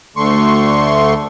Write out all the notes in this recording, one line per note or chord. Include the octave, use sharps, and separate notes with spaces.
D2 D3 A3 C6 C#6